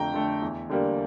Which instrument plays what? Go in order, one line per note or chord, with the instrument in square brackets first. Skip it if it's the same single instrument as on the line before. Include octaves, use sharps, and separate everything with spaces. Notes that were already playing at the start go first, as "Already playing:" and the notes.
Already playing: [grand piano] F2 D3 A3 G5 A#5
D3 A3
E2
D3 G3 A#3